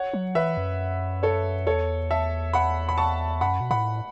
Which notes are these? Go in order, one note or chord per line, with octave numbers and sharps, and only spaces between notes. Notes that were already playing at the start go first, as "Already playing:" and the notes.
Already playing: C#5 F#5
F#3
E3 B4 E5
F#2
A4 C#5
E2 A4 C#5
E5 A5
F#5 B5
B5
A5 C#6
F#2 F#5 B5
B2
A2 F#5 B5